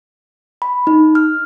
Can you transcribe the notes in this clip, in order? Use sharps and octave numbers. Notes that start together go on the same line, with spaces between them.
B5
D#4
F6